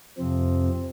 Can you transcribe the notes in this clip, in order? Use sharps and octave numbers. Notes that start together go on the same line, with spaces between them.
F2 C3 F3 C4